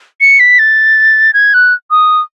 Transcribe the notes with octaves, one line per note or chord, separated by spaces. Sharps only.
C#7
B6
A6
G#6
F#6
D#6